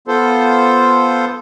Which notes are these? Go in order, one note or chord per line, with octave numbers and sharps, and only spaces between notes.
B3 F4 A4 C5